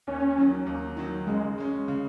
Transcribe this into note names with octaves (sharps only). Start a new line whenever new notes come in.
D#2 C#4
D#3 F#3
D#2
D#3 F#3
C#3 G#3
G#3 C#4
C#3